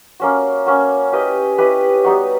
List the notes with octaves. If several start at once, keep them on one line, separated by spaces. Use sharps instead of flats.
A#3 C#4 F#4
A#3 C#4 F#4
E4 G4 B4 D#5
E4 G4 B4 D#5
G3 B3 D#4 F#4